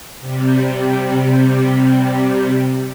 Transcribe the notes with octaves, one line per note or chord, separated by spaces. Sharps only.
C3 G3